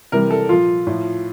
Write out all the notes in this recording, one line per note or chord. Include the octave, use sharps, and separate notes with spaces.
C3 E3 G3 A#4
A4
A#2 F3 F4
A2 F3